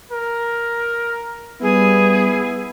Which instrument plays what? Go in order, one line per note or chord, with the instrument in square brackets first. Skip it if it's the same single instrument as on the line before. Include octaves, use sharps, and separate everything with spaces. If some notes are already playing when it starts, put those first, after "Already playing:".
[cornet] A#4
[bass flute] G3 [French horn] B3 [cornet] E4 [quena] G#4